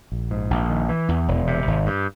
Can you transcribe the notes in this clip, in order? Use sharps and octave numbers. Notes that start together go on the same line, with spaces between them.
A#1
G#2
A#1
D#3
E3
E2
E1
C3
G#1
G2